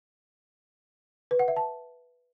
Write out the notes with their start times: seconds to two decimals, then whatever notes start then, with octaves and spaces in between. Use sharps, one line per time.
1.31 B4
1.39 F#5
1.48 E5
1.56 A5